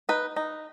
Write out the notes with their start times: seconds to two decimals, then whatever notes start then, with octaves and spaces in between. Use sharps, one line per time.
0.09 D#4 B4
0.36 D#4